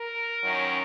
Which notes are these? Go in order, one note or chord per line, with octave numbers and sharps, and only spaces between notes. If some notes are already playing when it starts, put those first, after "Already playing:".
Already playing: A#4
F#2 D#3 F#3 C#4